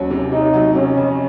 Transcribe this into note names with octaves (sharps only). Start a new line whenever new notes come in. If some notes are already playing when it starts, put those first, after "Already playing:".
Already playing: D#2 F#3 C#4
C3
C3 D#4
F#3
C3 C#4
F2